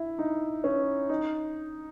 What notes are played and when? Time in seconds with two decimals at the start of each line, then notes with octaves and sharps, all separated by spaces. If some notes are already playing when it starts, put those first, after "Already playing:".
Already playing: E4
0.19 D#4
0.64 C#4
1.09 D#4